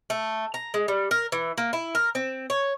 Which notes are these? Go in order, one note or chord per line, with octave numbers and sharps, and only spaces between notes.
A3
A#5
G#3
G3
A#4
E3
A#3
E4
A#4
C4
C#5